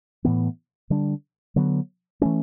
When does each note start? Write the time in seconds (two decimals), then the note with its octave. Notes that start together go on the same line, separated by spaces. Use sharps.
0.25 A2 E3 B3
0.90 D3 G3 D4
1.56 D3 F#3 B3
2.21 E3 A3 C#4